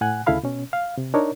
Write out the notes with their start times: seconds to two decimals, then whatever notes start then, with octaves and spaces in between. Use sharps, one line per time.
0.01 A2 F#5 G#5 F#6
0.27 D2 C#3 E4 A4 F5 B5
0.43 B2 C#4
0.73 F5
0.98 C3
1.14 D4 D#4 A#4 C#5